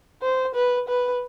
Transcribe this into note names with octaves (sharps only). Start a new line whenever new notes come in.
C5
B4
B4